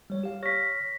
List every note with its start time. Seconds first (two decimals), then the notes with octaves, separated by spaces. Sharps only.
0.10 G3 C#5
0.23 G4 F5
0.43 C#5 C#6 F6 A#6 B6